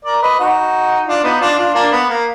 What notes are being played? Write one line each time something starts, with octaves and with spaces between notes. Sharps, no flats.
A#4 D5
B4 D#5
D#4 F#4
D4 F4
B3 D#4
D4 F4
D4 F4
A#3 D4
B3
A#3